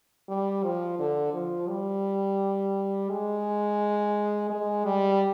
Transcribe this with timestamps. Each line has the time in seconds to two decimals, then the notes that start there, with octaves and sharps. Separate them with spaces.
0.28 G3
0.63 F3
0.99 D3
1.34 F3
1.69 G3
3.10 G#3
4.50 G#3
4.85 G3